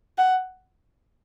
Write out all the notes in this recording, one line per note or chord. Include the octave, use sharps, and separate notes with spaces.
F#5